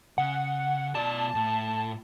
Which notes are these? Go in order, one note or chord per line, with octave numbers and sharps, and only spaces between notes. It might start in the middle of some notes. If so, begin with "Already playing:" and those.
C#3 F#5
B2 D5 A5
A2